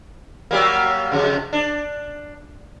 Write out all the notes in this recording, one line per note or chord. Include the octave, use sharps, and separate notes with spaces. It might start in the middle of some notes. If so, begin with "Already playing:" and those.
F#3 G3 A#3
F2 C#3
D4